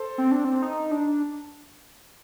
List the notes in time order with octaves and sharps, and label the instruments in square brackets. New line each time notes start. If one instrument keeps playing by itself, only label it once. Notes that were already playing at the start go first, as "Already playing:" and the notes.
Already playing: [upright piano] A4 C5
[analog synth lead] C4
D4
C4
D#4
D4